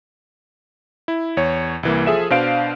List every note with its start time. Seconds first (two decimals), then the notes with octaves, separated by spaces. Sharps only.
1.08 E4
1.37 E2 C#5
1.83 C2 E3 A#3
2.06 F3 G#4 A4 E5 E7
2.30 B2 D4 C5 F5 D7